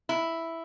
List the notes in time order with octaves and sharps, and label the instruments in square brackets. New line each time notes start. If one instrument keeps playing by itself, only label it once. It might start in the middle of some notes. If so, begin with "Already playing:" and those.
[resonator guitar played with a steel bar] E4